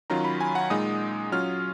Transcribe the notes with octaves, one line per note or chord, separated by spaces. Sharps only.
D#3 F#3 C#4 F4 A#5
B5
G#5
F#5
A#2 G#3 D#4 D#6
F#3 C#4 F4 F6